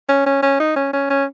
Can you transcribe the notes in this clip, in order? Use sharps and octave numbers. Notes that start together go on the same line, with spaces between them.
C#4
C#4
C#4
D#4
C#4
C#4
C#4